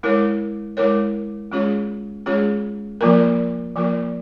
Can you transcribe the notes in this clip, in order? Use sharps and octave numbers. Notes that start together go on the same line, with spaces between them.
G#3 E4 A#4 C#5
G#3 E4 A#4 C#5
G#3 C#4 F4 G#4 C#5
G#3 C#4 F4 G#4 C#5
F3 A#3 F4 A#4
F3 A#3 F4 A#4